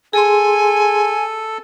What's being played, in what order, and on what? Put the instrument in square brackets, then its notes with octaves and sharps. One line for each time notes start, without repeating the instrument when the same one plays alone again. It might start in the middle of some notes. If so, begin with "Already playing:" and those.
[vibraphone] G#4 C6 [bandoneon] A4 [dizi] G#5